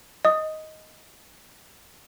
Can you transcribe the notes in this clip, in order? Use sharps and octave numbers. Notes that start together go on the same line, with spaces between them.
D#5 D#6